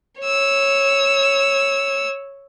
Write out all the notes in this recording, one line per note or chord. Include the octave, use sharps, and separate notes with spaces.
C#5 E6